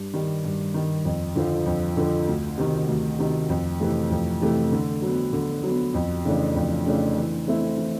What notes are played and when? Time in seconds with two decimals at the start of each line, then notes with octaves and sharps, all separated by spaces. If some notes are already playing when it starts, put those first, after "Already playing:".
Already playing: G2
0.13 D#3 G3
0.44 G2
0.74 D#3 G3
1.05 F2
1.35 D3 F3
1.66 F2
1.97 D3 F3
2.28 D2
2.58 C3 D#3
2.88 D2
3.19 C3 D#3
3.49 F2
3.80 C3 E3 A3
4.11 F2
4.41 C3 E3 A3
4.72 D3
5.02 F#3 B3
5.33 D3
5.63 F#3 B3
5.94 F2
6.25 C#3 E3 A3 D4
6.56 F2
6.86 C#3 E3 A3 D4
7.17 E3
7.47 A3 C4 E4
7.78 E3